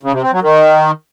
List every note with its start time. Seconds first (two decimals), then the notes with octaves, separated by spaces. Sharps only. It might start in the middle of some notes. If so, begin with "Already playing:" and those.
0.03 C#3
0.13 C3
0.23 C4
0.32 F#3
0.42 D#3